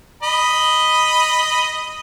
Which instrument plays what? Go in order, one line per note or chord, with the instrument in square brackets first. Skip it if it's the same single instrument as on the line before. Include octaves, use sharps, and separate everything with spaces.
[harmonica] D#5 B5